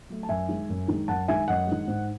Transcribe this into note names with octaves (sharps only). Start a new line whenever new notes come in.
F#3 A3
A5
F#2 E5 G#5
D#3 G#3
F#2
D#3 G#3
F#2 F#5 A5
D#3 G#3 E5 G#5
F#2 D#5 F#5
D#3 G#3
G#2